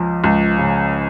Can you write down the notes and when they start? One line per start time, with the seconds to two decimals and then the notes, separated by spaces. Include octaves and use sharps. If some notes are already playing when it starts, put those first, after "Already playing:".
Already playing: C#2 F3
0.24 C#2
0.58 C#3